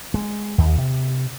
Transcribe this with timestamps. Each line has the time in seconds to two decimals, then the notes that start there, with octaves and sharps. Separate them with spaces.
0.14 G#3
0.58 D#2
0.78 C3